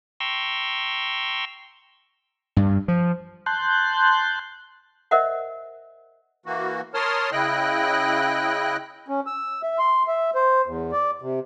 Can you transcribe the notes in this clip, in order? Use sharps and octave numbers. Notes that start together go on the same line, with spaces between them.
G5 A#5 C6 C#6 E6
G2
F3
A5 C6 F#6 G6
A#4 C5 D#5 E5 F#5
E3 A#3 F#4
A#4 C#5 A5 C6 D#6 F6
C#3 E4 D#5 G5 F#6
C#4
E6
E5
C6
E5
C5
E2
D5
C3